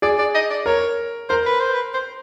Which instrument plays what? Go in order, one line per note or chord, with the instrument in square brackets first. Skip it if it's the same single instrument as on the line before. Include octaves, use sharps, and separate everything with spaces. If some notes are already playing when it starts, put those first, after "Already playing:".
[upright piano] G#4 [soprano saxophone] D5
[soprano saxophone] D5
D#5
D5
[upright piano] A#4 [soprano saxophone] C#5
[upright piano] A#4 [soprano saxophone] C5
[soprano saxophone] B4
C5
B4
C5